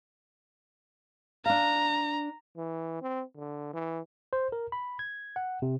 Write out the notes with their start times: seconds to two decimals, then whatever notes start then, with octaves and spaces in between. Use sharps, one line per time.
1.46 D4 F5 A#5
2.57 E3
3.02 C4
3.36 D3
3.73 E3
4.33 C5
4.52 A#4
4.72 B5
4.99 G#6
5.36 F#5
5.62 C3